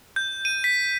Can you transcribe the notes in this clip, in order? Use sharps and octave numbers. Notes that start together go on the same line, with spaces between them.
G6
D#7
B6